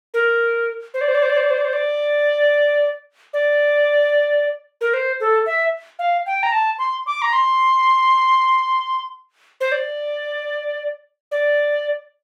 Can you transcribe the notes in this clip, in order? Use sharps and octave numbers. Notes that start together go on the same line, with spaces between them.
A#4
C5
D5
C5
D5
C5
D5
C5
D5
C5
D5
C5
D5
D5
A#4
C5
A4
E5
F5
G5
A#5
A5
C6
D6
A#5
C6
C5
D5
D5